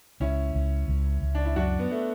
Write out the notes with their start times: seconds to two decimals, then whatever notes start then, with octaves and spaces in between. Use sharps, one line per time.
0.20 C#2 C#4 E4
0.55 C#2
0.88 C#2
1.22 C#2
1.35 D4
1.45 E4
1.56 F#2 D4 F#4
1.79 B3
1.91 A3